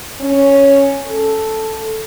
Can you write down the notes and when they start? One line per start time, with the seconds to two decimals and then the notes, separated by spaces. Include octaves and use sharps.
0.21 C#4
1.06 A4